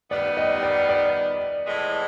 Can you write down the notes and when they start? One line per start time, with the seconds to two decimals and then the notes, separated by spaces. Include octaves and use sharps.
0.11 D#3 G3 B3 D5
0.37 D#5
0.63 D5
0.89 D5
1.66 A2 E3 G#3